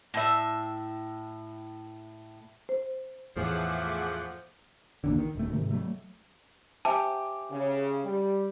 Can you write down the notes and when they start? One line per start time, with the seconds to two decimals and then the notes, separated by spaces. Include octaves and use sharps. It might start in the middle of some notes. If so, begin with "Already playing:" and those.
0.14 A2 E5
2.69 C5
3.36 E2 A2 F3 A3 G#4 E5 F#5 D6
5.04 A#1 D#2 D3
5.18 D#3
5.36 D#1 A3
5.52 G#2 C3 D#3
5.71 F#3 A3
6.85 G4 C5 E5 G#5 A5
7.50 C#3
8.03 G3